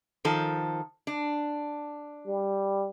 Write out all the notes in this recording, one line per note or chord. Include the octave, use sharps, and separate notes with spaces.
D#3 F3 A4
D4
G3